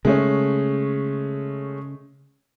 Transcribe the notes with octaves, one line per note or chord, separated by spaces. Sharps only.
C#3 G#3 A3 C#4